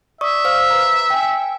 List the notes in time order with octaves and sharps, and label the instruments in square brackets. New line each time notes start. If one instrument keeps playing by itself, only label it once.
[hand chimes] D5 C#6 D#6 [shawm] E5
[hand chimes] C5 F5 F6
B4 A#5
G5 G#5